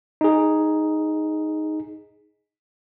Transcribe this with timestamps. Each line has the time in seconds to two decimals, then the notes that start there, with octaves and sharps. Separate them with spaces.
0.21 D#4 G#4